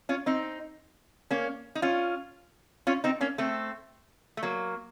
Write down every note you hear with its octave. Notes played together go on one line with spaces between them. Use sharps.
C#4 F4
C4 D#4
A#3 C#4
D#4
C#4 F4
C#4 F4
C4 D#4
A#3 C#4
A3 C4
A3
F#3 A#3